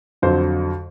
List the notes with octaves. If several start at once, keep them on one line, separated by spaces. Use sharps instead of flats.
F2 D3 F#3 C5